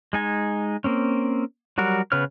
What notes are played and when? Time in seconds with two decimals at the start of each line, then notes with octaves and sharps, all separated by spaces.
0.13 G#3 D#4 G#5
0.84 A#3 C4 C#4
1.78 F#3 G3 F#4 A#4
2.12 C#3 B3 B4 C#5 F6